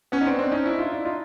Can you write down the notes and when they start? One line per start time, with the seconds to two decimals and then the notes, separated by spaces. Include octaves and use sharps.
0.12 B3 C#4
0.21 D#4
0.26 C4 D4
0.39 C4 D4
0.52 C#4 D#4
0.65 D4 E4
0.79 D#4 F4
0.92 D4 E4
1.05 D#4 F4